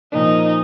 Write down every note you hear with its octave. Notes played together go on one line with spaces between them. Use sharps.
A#2 F3 A#3 D#4